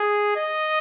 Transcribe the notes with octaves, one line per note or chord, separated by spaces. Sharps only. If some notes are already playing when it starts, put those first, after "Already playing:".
Already playing: G#4
D#5